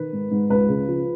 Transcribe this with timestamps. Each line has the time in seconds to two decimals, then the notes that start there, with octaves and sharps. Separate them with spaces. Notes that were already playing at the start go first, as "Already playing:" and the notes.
Already playing: D#3 B4
0.13 G#2
0.31 G#2
0.50 C#2 B4
0.68 C#3
0.88 F3